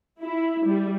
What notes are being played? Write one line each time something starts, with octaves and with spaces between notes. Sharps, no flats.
E4
G3